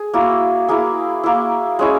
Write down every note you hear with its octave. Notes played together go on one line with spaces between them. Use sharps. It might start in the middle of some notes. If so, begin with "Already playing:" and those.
Already playing: G#4
A#3 E4 F#4
A#3 E4 G#4
A#3 E4
G#3 C#4 E4